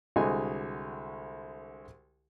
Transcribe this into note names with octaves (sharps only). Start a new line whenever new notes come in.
C2 D3 G#3 F#4 D#5 G#5